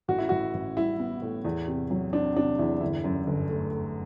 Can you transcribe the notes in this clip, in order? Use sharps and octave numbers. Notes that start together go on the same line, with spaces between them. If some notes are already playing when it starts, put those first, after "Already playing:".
A1 F#4
E4
A1 F#4
A1
G3 E4
B3
A2
E2
C3
F#3
C4 D4
C3 D4
E2 E4
G1 E4
F#2
G1
A3
A3